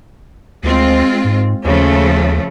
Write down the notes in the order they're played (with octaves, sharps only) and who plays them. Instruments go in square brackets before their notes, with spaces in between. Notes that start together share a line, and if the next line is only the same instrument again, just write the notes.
[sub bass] D2 [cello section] G#3 C4 F4
[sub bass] G#2
[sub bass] D#2 [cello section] C#3 F3 A3